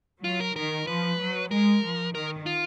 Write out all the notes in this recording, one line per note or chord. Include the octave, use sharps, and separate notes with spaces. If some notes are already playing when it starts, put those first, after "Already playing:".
F#3 F4
A#4
D#3 A#4
F3 B4
F#3
G#3 A#4
F3
D#3 A#4
F4